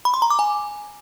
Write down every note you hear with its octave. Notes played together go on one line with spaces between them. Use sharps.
B5
C6
A#5
D6
G#5